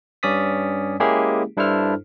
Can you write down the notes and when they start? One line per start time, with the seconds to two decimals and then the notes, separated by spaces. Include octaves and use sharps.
0.23 G2 C#4 D5 D#6 B6
1.00 G#3 A#3 C#4 E4 G4 G#4
1.57 G2 D4 E4 A4 C5 F6